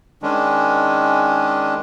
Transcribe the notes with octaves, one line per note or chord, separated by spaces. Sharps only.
D#3 G#3 C#4 D4